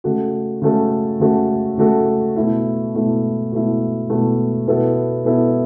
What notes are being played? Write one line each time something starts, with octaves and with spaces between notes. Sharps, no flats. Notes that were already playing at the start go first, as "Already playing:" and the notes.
C#3 A3 F#4 A4
C#3 A3 F#4 A4
C#3 A3 F#4 A4
C#3 A3 F#4 A4
B2 A3 E4
B2 A3 E4
B2 A3 E4
B2 A3 E4
B2 B3 E4 A4
B2 B3 E4 A4